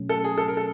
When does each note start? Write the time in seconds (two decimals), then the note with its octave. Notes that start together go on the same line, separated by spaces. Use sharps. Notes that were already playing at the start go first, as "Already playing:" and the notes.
Already playing: B2 F#3 A3 C#4
0.09 A4
0.24 G#4
0.38 A4
0.48 A#4
0.57 A4